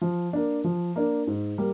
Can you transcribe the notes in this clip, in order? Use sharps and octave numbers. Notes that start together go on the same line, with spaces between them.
F3
A#3 D4
F3
A#3 D4
G#2
G3 A#3